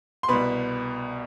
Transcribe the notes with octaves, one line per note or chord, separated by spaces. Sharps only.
C6
C2 B2 B4 B5